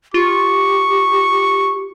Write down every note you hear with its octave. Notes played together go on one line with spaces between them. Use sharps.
F4 G4 C#6